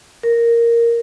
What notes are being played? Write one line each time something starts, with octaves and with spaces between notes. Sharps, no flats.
A#4